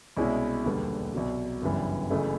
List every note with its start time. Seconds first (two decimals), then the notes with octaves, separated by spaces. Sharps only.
0.17 C2 B2 G#3 C#4 E4
0.65 E1 D#2 D3 G3 B3
1.14 C2 B2 F#3
1.62 G1 F#2 C#3 E3 G3
2.10 F#1 F#2 C#3 E3 A3